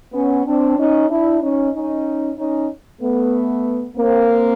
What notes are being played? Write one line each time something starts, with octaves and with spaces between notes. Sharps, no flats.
B3 C#4
C4 D4
C#4 D#4
D4 E4
C#4 D#4
C#4 D#4
C#4 D#4
A3 B3
A#3 C4